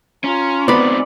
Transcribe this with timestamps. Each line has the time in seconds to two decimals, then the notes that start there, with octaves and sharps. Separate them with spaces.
0.24 C#4 F4 A#5
0.68 B3 C4 D#4 D5 B5